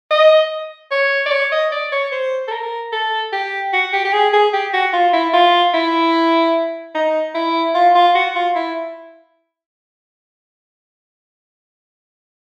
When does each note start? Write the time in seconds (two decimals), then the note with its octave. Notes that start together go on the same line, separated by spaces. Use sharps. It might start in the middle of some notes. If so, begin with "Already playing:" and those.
0.11 D#5
0.91 C#5
1.26 D5
1.32 C#5
1.52 D#5
1.72 D5
1.92 C#5
2.12 C5
2.48 A4
2.52 A#4
2.93 A4
3.33 G4
3.73 F#4
3.93 G4
4.05 G4
4.13 G#4
4.33 G#4
4.53 G4
4.73 F#4
4.93 F4
5.13 E4
5.34 F4
5.74 E4
6.95 D#4
7.35 E4
7.75 F4
7.95 F4
8.15 F#4
8.35 F4
8.55 E4